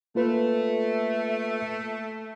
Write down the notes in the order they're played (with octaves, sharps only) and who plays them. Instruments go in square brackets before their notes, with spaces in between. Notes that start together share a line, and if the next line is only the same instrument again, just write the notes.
[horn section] A3 [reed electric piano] A#3 F4 B4